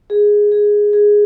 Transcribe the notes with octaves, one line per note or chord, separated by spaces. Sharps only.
G#4
G#4
G#4